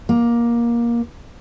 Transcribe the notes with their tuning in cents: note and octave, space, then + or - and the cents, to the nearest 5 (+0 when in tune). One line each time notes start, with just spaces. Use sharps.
A#3 +15